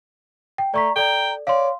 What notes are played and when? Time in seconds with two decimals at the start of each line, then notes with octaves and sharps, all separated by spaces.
0.58 G5
0.74 A3 D5 A#5 C#6 B6
0.96 A4 D5 G5 A#5
1.47 C#5 D5 F5 C6